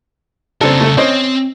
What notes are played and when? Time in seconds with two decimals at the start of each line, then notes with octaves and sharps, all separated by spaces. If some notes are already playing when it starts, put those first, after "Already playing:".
0.61 C#3 C4 D4 A4 A#4
0.81 A3 A4
0.97 C4 C#4 C5 D#5